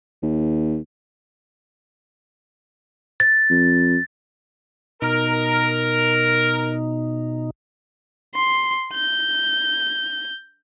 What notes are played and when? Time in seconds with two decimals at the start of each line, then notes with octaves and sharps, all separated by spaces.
0.23 D#2
3.20 A6
3.50 F2
5.02 B2 D#4 A#4
8.35 C6
8.95 G6